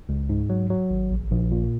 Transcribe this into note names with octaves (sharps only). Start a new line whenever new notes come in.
C#2
G#2
F#3
F#3
G#1
A#1
A#1
A#2